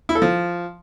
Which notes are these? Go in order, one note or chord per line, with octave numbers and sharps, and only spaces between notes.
E4
A4
F3